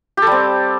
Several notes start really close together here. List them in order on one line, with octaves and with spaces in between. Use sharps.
G4 A4 G3 C4